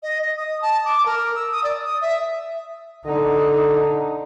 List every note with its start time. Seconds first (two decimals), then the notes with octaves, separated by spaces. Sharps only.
0.03 D#5
0.22 D#5
0.37 D#6
0.62 A5
0.85 D6
1.06 A#4
1.35 E6
1.52 D#6
1.64 D5
1.84 D#6
2.02 E5
3.06 D3 D#4